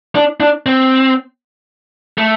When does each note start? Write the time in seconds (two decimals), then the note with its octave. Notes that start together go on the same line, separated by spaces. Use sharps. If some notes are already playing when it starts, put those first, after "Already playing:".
0.15 D4
0.40 D4
0.66 C4
2.18 A3